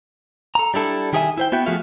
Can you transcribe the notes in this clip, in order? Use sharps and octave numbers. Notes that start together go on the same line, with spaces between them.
A4 A#5
G3 D4 E4 A4
D#3 G4 G#4 A#4 E5 G#5
E4 C5 G5
B3 F#4 E5 G5
F3 A3 F#4 G#4 E5 F5